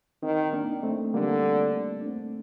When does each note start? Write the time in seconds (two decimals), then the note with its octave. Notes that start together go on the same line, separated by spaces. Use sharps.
0.23 D#3 C4 D#4
0.53 A#3 D4
0.83 A3 C4
1.14 D3 G3 A#3
2.01 D4
2.06 A3 C4